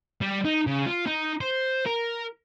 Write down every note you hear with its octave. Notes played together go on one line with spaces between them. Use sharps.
G3
D#4
C#3
F4
D#4
C5
A#4